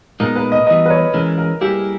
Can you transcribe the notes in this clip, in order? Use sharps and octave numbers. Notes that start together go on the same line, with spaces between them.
A#2 G#3 B3 D#4 A#4
B4
D#5
E3 G3 B3 D#5
B4
C#5
E3 G#3 C#4 A#4
A#4
G3 A#3 E4 G4 G#4